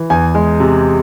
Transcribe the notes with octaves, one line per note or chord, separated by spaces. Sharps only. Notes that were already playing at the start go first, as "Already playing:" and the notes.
Already playing: E3
E2 G#5
G#3
C3